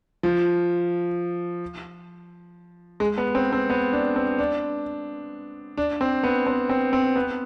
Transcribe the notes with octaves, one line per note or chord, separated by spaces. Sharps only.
F3
G#3
B3
C4
C4
B3
D4
C4
D4
D4
C4
B3
C4
C4
C4
B3